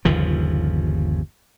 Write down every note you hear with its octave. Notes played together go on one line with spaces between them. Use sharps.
G1 D#2 C#3 F3